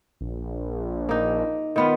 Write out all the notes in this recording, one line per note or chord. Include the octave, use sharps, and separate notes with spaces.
A#1
A#3 D#4
D#3 B3 F4